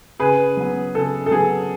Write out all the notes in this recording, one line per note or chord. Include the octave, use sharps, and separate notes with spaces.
C#3 G#4 B4
F#3 B3
C#3 A4
A4
F#3 B3 G#4